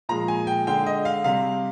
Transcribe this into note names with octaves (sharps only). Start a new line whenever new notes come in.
A#2 F3 G#3 A#5
G#5
G5
D3 G#3 G5
D#5
F5
C3 G3 F5